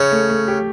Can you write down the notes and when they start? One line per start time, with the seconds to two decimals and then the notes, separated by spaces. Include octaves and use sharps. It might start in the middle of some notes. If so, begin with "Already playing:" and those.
Already playing: C#3 C#5
0.12 A3
0.30 A3
0.48 G4